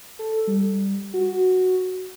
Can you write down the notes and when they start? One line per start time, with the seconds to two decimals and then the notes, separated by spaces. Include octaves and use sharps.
0.19 A4
0.47 G3
1.14 F#4